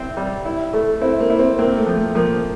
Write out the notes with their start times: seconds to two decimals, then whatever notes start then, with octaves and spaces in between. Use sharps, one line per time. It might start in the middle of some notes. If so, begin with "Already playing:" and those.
Already playing: C4 E4
0.17 G3
0.46 E4
0.73 A3
1.01 C4 E4
1.20 A#3
1.30 E4
1.39 C4
1.59 A#3 C4
1.77 A3
1.87 F3
1.96 A3
2.15 F3 A#3